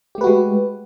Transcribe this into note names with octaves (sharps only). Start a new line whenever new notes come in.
G#3 A3 F#4 G4 B4